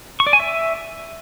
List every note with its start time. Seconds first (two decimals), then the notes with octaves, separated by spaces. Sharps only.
0.20 C#6
0.27 D5
0.33 G#5
0.40 E5